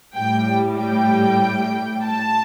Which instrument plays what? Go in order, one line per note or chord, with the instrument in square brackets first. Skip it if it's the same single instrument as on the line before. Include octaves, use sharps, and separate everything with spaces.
[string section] A2 G3 G5
G5
A5